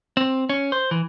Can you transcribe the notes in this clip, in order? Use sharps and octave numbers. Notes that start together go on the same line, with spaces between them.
C4
C#4
C5
E3